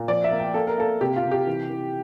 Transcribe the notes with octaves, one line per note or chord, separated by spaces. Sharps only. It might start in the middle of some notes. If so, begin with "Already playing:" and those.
Already playing: A#2
F3 D5
E5
A#3
G5
A#3 A4
A#4
A#3 A4
C3 G4
F4
C3
G4
E3
E3